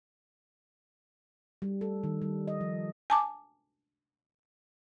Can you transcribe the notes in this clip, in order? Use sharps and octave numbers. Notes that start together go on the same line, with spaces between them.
G3
A4
D#3
G3
D#5
F3
G#5 A5 D6